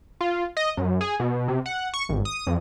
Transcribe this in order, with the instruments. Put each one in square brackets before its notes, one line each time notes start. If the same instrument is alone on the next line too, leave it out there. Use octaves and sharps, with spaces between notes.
[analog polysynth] F4
D#5
F#2
G#4
B2
C3
F#5
C#6
G#1
D#6
F2